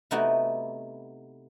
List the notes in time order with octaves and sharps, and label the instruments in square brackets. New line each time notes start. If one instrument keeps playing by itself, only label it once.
[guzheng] C3 A3 B3 D#4 E4 F#4